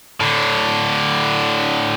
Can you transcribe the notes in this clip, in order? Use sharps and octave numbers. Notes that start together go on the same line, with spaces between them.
A2 D3